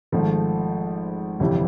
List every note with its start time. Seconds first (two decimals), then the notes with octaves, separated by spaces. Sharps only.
0.12 G#1 G#2 F3 A3
1.40 G1 F2 C3 E3 G3